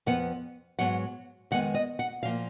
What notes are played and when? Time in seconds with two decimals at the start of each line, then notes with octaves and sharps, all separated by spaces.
0.06 F2 F3 B3 F#5
0.79 G#2 F#3 B3 F#5
1.51 F2 D#3 G#3 B3 F#5
1.74 D#5
1.99 F#5
2.23 A#2 F3 A#3 F5